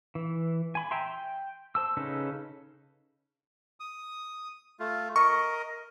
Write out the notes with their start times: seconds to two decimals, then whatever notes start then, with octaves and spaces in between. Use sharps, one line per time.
0.15 E3
0.75 G#5 B5
0.91 E5 G5 A#5 C6
1.06 G5
1.75 C5 A5 E6
1.97 C#3 C#4 D#4 A4 B4
3.80 D#6
4.80 A3 F4
5.16 A#4 D#5 C#6